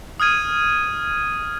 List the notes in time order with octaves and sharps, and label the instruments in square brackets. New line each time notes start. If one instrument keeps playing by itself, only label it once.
[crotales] D#6 F6 G#6 D#7